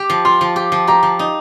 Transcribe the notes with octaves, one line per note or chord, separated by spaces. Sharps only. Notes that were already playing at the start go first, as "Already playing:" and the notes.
Already playing: G4
F3
F4 C6
F3
G4
F3
G4 A#5
F3
D#4